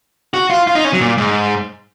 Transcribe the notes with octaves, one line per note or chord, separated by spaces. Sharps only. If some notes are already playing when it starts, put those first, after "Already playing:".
F#4
F4
F4
D#4
C#4
F#3
A#2
G#2